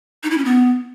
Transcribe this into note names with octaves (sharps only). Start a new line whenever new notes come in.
D#4
E4
C#4
B3